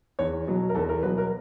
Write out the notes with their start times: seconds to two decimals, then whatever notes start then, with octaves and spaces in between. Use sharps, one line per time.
0.19 E2 C#5
0.47 B2 F#3
0.69 A#4
0.75 E2 A4
0.89 A#4
1.03 B2 F#3 B4
1.18 A#4